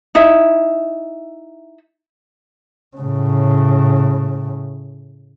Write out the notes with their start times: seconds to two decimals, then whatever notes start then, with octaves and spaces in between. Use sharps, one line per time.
0.15 D#4 E4 E5
2.97 A2 C#3